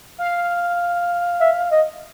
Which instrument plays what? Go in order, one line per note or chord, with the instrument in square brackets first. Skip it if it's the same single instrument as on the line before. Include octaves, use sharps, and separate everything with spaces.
[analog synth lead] F5
[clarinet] E5
D#5